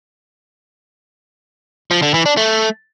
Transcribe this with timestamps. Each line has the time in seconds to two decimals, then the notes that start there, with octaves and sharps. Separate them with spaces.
1.91 F3
2.02 D3
2.14 E3
2.26 D4
2.37 A3